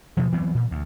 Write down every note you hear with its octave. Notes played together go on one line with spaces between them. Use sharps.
B2 F3
E3 F#3 B3 C4
A#2
D2